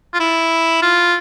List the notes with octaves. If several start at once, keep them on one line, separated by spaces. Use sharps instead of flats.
F4
E4
F4